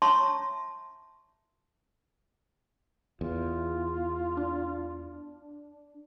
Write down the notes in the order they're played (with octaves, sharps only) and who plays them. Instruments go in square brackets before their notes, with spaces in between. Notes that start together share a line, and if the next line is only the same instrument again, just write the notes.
[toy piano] C#5 E5 A5 A#5 C6 C#6
[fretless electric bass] E2 [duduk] F4
[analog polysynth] D4